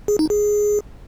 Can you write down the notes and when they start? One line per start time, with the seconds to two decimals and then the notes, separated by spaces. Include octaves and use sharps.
0.08 G#4
0.19 D#4
0.30 G#4